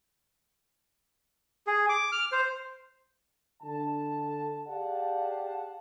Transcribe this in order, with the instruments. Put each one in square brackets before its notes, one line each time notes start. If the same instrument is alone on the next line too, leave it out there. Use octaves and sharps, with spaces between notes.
[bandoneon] G#4
D6
F6
C5
[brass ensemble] D3 A5
G4 G#4 D5 F5 F#5 A5